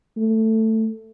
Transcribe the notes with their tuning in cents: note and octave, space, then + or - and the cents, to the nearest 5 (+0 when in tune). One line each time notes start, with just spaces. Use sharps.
A3 +10